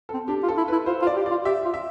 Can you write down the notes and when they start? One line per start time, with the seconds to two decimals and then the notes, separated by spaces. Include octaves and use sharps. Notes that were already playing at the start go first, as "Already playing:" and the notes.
0.09 C4 A4
0.28 D4 G4
0.43 F4
0.48 A4
0.57 E4
0.68 E4 B4
0.86 F4 C5
1.02 F4
1.07 D5
1.16 G4
1.26 F4 D5
1.45 G4 E5
1.65 F4
1.74 E5